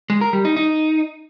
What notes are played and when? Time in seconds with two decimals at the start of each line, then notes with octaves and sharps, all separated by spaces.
0.10 G#3
0.21 A#4
0.33 G3
0.45 D#4
0.56 D#4